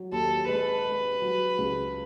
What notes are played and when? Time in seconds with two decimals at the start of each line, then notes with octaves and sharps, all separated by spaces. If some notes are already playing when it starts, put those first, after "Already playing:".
Already playing: F#3
0.12 D#2 A4
0.48 G#3 B4
0.85 G#3
1.22 F#3
1.58 C#2